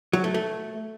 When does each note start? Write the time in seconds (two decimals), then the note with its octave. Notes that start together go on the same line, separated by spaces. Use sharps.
0.13 F#3
0.24 A3
0.34 A3